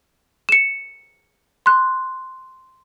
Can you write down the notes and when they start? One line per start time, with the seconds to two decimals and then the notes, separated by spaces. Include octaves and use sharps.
0.49 C#7 E7
1.66 C6 F#6